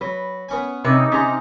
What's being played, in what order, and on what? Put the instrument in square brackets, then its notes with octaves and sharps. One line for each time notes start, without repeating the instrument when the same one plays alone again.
[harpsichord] F#3 [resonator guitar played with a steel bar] B4
[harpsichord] B3 C#4 G#5
[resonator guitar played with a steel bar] C3 C#4 [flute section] D#4 D6 [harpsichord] B4
[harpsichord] C3 C4 [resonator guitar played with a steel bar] C#4 A#5